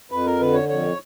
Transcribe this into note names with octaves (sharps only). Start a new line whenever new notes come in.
F2 B4
A#4
D3 B4
C#5
F2 C#5